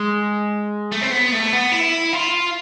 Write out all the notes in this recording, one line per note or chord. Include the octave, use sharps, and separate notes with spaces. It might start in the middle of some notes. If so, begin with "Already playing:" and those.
Already playing: G#3
A3
C4
B3
A3
B3
E4
F4